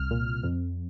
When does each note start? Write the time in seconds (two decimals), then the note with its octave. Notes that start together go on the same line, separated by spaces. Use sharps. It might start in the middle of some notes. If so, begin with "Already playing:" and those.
Already playing: C2 F6
0.11 A#2
0.43 F2